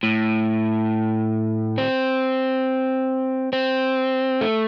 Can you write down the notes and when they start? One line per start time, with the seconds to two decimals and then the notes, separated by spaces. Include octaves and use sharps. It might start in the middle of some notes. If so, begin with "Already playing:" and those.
0.03 A2
1.78 C4
3.53 C4
4.41 A3